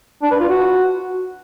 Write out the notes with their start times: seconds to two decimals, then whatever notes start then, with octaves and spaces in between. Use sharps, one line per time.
0.23 D4
0.31 B4
0.40 F4
0.49 F#4